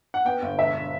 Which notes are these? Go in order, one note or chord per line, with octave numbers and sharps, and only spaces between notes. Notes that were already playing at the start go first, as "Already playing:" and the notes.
F#5
B3 G5
G1
E1 E5